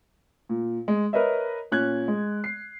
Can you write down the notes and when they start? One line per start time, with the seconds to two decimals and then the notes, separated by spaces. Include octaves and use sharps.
0.49 A#2
0.88 G#3
1.13 A#4 B4 C#5 D#5 E5
1.72 A#2 C#4 F#6 G#6
2.08 G#3
2.44 C7